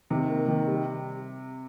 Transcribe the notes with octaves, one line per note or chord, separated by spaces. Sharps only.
C3 D#3
A#3
D#3
G3